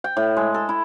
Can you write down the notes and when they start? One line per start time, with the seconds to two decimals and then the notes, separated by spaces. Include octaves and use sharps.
0.04 G5
0.17 A2
0.37 G#3
0.54 A4
0.69 E4